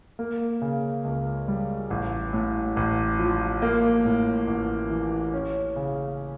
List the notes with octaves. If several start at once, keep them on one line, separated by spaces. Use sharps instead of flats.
A#3
C#3
C#2
G3
A1
A2
A1
F3
A#3
A2
A1
E3
C#4
C#3